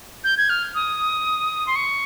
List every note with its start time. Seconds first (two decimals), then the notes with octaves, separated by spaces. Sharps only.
0.24 G6
0.37 G#6
0.49 F6
0.75 D#6
1.67 C6
1.76 C#6